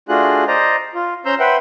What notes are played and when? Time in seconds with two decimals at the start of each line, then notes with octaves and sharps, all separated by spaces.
0.09 A3 D4 F4 F#4 G#4 F#6
0.48 C5 D5 D#5 A#5
0.94 F4
1.25 C#4 C5 A#5 C6 E6 G6
1.39 B4 C5 E5 F#5 G5